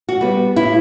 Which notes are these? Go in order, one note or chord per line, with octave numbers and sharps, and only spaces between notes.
F#4
G3 B3
A2 E4